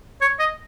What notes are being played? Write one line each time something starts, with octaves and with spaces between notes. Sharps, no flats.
C#5
D#5